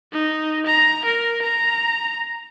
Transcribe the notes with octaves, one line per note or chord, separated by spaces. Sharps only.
D#4
A#5
A#4
A#5